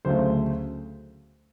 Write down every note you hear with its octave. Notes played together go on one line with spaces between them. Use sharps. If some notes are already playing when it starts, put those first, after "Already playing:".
D2 C#3 F#3 A3 C5